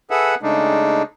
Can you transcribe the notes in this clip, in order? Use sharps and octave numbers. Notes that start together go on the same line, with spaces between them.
G#4 A4 B4 E5 F#5
C#3 G#3 A3 D4 D#4